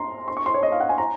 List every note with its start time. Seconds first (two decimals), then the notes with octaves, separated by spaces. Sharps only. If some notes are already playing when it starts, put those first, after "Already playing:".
Already playing: A#5 C6
0.28 C6
0.37 C#6
0.46 C6
0.54 C#5
0.63 D#5
0.72 F5
0.81 F#5
0.89 G#5
0.98 A#5